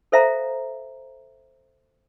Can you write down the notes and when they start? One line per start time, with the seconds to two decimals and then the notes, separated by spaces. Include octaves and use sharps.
0.12 A4 C5 E5 F5 A#5